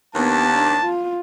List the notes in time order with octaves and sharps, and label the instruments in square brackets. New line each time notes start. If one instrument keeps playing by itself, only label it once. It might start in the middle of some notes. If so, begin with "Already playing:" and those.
[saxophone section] D#2 [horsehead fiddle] B3 D4 [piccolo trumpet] A5
[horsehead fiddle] D4
F4